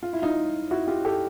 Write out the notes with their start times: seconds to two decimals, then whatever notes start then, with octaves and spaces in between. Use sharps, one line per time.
0.03 F4
0.13 E4
0.22 D#4 F4
0.71 E4 F#4
0.88 F4 G4
1.05 G4 A4